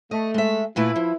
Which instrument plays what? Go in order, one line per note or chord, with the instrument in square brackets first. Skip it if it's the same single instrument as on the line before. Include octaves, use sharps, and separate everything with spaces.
[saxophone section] A3 [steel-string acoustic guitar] D#5
[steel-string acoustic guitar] G#3 E5
[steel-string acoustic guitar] A#2 A3 B4 [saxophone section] E4
[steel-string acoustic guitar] F3